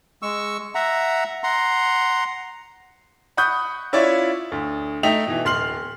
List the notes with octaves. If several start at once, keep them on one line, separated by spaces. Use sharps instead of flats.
G#3 C#6 E6
E5 F#5 A#5
F#5 A#5 C6
F#5 B5 C#6 D#6 F#6 G6
C#4 E4 F4 C#5 D5 E5
D2
A3 D#4 E5 G5 B6 F7
B2 E3
D1 C6 F6 C7 F#7